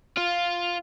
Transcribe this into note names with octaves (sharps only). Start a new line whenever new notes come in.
F4